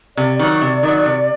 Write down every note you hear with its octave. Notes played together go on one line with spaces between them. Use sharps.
C3 D5
D#3 F#3 D5
C3
D#3
F#3
C3